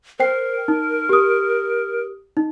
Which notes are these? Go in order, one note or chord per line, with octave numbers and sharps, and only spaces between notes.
A#4 C5 G5 C7
D#4
G4 D#6
D#4